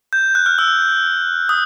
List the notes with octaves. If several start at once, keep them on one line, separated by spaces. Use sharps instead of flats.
G6
F#6
F6
E6
D#6